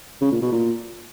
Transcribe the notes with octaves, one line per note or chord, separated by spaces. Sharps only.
C#3
A#2
B2
A#2